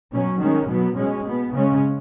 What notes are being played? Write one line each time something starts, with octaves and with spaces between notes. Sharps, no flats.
B2 F#3 C#4
D#3 G#3 C#4
B2 F#3 B3
B2 G#3 C#4
B2 B3
C#3 G#3 C#4